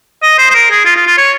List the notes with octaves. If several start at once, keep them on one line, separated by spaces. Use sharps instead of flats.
D#5
C5
C5
A#4
G#4
F4
F4
F4
C#5